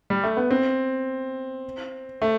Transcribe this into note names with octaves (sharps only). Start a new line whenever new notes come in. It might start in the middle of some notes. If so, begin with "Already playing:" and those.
G3
A3
B3
C4
A3